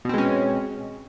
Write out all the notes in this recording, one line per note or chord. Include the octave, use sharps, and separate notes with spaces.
B2 G#3 C4 C#4